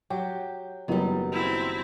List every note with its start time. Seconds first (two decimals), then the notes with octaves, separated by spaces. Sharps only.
0.10 F#3 G4 F#5 G5
0.88 F#1 D#3 F#3 G3 B3
1.32 C4 E4